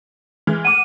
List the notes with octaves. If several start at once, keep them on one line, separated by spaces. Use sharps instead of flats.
E3 G#3 F6
F#5 D6 D#7